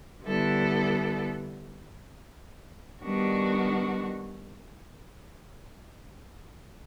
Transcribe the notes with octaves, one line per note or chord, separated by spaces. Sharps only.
D3 G3 B3 E4 A4
D#3 G3 B3 D4 F#4